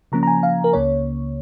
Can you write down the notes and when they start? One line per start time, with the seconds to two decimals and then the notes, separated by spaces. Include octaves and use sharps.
0.12 C#3 F3 A#3 C#4 A#5
0.23 A#5
0.27 G#5
0.43 F5
0.64 A#4
0.73 C#2 C#3 A#3 C#5